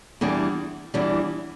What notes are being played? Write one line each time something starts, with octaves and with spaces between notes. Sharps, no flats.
E2 E3 G3 D4
E2 E3 G3 D4